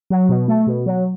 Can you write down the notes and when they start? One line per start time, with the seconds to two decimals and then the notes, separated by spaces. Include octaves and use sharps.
0.10 F#3
0.29 B2
0.48 A3
0.67 B2
0.86 F#3